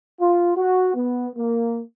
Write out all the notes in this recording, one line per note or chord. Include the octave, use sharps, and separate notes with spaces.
F4
F#4
B3
A#3